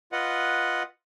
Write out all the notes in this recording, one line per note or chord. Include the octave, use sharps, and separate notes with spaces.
F4 B4 D#5 F#5